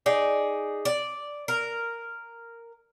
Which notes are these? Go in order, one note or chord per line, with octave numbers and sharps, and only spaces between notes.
D#4 G#4 D5
D5
A#4